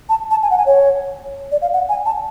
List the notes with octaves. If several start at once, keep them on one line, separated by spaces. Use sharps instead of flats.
A5
A5
G#5
F#5
G#5
C#5
D5
F5
F#5
G#5
A5